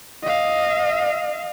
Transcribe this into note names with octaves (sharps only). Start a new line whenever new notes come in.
D#5 F5